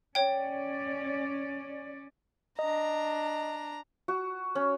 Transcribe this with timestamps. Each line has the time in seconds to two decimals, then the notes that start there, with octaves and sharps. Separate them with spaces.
0.15 C#4 C#5 D5 G5
2.59 D4 D#5 A#5
4.08 F#4
4.55 C#4